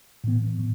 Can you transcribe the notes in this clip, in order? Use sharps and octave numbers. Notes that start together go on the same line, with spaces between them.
A2 E3 B3
A2 E3